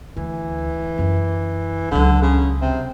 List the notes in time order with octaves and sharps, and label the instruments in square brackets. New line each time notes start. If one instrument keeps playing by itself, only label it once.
[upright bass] D2 [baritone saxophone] E3
[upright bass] F#2 C#4
[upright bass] C#2 F#3 [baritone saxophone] D3
[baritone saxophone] C#3
C3